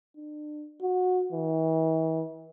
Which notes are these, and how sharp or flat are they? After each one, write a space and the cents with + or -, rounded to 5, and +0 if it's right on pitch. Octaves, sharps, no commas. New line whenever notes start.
D4 +35
F#4 -20
E3 -40